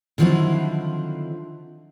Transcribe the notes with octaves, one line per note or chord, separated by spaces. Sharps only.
D3 D#3 F3 F#3 C4 E4